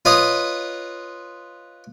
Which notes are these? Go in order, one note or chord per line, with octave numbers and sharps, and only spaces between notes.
F4 B4 C#5 D#5 F5 D#6